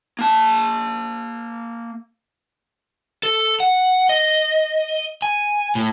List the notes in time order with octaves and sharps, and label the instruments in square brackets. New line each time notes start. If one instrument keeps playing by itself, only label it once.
[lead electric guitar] A#3 A5
[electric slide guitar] A4
F#5
D#5
G#5
A2